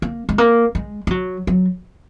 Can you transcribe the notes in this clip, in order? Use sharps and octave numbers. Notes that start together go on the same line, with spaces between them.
A#3
G#3
A#3
G#3
G#3
F#3
F#3